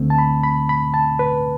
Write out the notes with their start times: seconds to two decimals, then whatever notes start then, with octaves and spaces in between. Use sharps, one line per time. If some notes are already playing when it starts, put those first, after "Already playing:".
Already playing: D2 D3 A3 C4
0.10 A5
0.18 B5
0.44 B5
0.69 B5
0.94 A5
1.19 B4